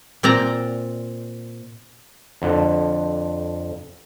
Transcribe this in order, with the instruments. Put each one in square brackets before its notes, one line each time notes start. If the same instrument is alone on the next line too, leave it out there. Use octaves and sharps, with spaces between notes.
[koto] A#2 C4 D5 A#5
[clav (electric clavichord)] F2 D3